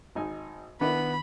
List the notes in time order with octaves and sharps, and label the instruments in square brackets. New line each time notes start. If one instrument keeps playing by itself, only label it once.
[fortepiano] G#1 D#4 G#5
[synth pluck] D#3 [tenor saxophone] B3 [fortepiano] D4 E4 [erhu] B5